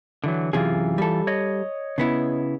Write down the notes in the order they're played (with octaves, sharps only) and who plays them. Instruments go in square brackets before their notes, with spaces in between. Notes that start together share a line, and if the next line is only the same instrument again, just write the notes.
[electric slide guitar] D3 E3 F#3
[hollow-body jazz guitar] F#2 C3 G#4 [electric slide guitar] E3 F4
[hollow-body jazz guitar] G3 A4
[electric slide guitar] C#5 D#5
[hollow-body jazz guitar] C#3 B3 E4